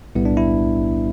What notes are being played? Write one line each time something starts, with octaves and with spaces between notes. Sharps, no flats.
B1 A2 G3 B3 E4
D4
E4